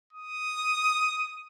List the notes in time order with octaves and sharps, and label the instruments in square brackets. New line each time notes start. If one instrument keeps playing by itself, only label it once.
[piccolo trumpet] D#6